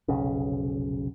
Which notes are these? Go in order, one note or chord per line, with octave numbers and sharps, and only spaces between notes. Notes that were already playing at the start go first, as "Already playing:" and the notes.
F1 B1 C#3